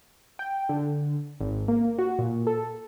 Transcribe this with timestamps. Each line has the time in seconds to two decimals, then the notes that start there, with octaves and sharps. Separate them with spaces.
0.39 G5
0.69 D3
1.40 G#1
1.68 A#3
1.99 F#4
2.19 A#2
2.47 A4